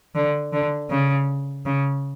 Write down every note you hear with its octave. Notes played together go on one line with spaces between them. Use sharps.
D3
D3
C#3
C#3